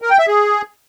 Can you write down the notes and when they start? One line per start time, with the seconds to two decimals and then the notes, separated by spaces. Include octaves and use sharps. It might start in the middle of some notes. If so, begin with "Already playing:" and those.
0.02 A#4
0.10 G5
0.19 E5
0.27 G#4